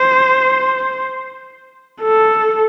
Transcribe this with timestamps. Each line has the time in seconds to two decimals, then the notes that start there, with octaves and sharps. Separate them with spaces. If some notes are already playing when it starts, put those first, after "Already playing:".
Already playing: C5
2.02 A4